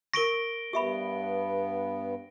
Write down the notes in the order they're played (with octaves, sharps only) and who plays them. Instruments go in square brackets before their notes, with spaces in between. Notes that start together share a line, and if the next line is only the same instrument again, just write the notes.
[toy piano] A#4 C#6 [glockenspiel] A#6 D7 G7
[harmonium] G2 B3 [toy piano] G4 E5 B5